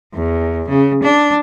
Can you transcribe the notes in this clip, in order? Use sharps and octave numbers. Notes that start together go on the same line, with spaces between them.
E2
C#3
D4